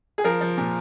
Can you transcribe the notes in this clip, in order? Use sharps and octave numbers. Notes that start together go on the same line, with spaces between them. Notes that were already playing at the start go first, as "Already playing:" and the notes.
G#4
F3 A#4
F3
A#2